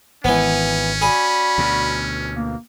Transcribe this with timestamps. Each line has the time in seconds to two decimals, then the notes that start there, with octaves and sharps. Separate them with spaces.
0.24 G#1 E3 B3 C#4
1.01 F#4 G#4 D5 B5
1.58 D2 B2
2.34 A#3